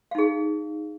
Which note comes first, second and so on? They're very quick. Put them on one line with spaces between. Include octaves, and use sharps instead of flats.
F5 D#4 G#4